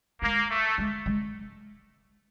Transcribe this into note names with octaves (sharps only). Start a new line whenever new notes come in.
G#3 A#3
A3
G#3
G#3